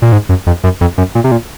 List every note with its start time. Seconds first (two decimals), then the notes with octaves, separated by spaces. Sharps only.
0.02 A#2
0.12 G#2
0.29 F#2
0.47 F2
0.64 F#2
0.81 F2
0.98 F#2
1.15 A#2
1.24 C3
1.32 A#2